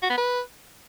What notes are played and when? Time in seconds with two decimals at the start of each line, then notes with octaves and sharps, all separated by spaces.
0.03 F#4
0.10 B3
0.18 B4